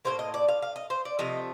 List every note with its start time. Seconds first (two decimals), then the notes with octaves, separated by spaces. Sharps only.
0.05 A2 F3 A#3 C5
0.19 D#5
0.34 D5
0.48 F5
0.62 F5
0.76 D#5
0.90 C5
1.05 D5
1.19 C3 F3 A3 D#5